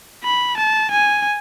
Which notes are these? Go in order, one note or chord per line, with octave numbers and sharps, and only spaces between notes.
B5
A5
G#5